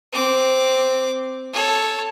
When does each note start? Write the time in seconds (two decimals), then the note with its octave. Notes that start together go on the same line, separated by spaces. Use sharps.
0.13 C4 D6
1.53 A4 C#5